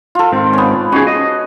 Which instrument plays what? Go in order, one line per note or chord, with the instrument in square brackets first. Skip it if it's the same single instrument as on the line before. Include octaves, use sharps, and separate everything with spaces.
[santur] F4 A4
[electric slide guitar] G#2 D#3 C4
[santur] B3 C#4
[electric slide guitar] C#4 D#4 G#4 [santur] F#4
[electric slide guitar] D#5